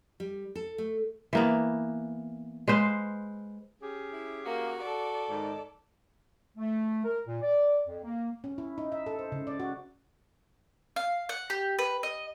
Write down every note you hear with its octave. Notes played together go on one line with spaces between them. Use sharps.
G3
A4
A3
E3 A#3 B3
G#3 B4 C5 F5
C#4 G4 G#4
E4
A#3 F#4
A4 D5
G#2 D#3 D#4
A3
A#4
A#2
D5
F2
A#3
C#4
E4
D#4
E5
A4
C5
C#3
D5
F#4
F5
F#5
G4
B4
D#5